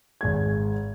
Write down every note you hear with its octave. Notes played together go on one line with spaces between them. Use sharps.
G#1 G#3 G#6